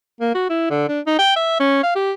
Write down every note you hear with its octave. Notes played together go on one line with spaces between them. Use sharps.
A#3
F#4
E4
D3
D4
D#4
G5
E5
C#4
F5
G4